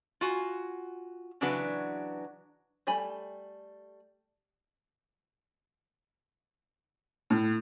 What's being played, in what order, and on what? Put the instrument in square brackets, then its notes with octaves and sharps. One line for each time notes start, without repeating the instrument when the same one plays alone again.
[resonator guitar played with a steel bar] F4 F#4 G#5
C#3 E3 F#3 D4 F#4 B4
[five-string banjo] G3 A3 G#5 B5
[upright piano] A2